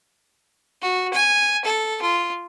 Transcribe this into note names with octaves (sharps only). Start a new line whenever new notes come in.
F#4
G#5
A4
F4